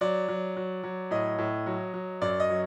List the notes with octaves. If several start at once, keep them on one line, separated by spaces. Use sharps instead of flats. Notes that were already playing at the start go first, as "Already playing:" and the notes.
F#3 D5
F#3
F#3
F#3
A2 D#5
A2
F#3
F#3
F#2 D5
D#5
F#3